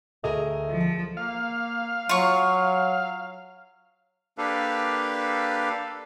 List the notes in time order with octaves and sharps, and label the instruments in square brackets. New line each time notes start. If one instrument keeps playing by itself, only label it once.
[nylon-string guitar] D2 G#4 A#4 [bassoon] A3 [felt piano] D#5
[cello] F3
[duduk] A#3 [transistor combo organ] F5
[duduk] F#3 [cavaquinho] F4 C#6
[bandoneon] A#3 D4 G4 A4 B4 F5